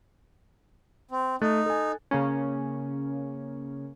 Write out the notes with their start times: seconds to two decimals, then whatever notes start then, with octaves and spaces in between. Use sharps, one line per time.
1.11 C4
1.42 A3 D#4 F#6 A6
1.66 A4 G#5
2.11 C#3 A#3 C#4